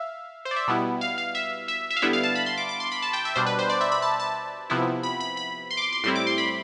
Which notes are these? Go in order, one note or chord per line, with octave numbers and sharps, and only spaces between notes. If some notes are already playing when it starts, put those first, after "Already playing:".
Already playing: E5 F5
C5
D5
E5
B2 G3 B3 E4
F5
F5
E5
E5
E5
F5
D3 G3 B3 E4 E5
F5
A5
B5
C6
D6
D6
C6
B5
A5
G5
E5
B2 G3 D4 C5
B4
C5
D5
E5
B5
A5
A5
C3 F3 B3 E4
B5
B5
B5
C6
D6
C6
C6
A2 G3 C4 E4 C6
D6
C6
B5